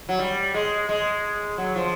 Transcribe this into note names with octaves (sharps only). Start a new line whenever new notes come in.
F#3
G3
G#3
G#3
F#3
F3